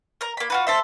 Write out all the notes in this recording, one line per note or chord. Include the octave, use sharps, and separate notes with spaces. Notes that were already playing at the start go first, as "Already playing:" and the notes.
A#4 A#5
A#3 B5
F4 F#4 B4
A4 C5 E5